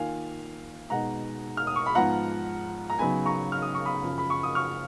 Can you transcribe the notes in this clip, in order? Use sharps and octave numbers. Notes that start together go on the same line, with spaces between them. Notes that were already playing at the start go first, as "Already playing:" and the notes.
Already playing: D#3 A#3 F4 F5 G#5
B2 G#3 D#4 F#5 A#5
F6
D#6
C#6
B5
G#2 F3 B3 F4 F#5 A#5
A#5
C#3 F#3 B3 D#4 G#5 B5
A#5 C#6
F6
D#6
C#6
B5 D#6
F#2 C#3 F3
B5
C#6
D#6
C#6 F6